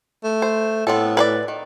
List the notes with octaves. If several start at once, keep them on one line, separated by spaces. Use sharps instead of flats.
A3
C5
A2 B3 C4 A4
B4 C5 D5
D#3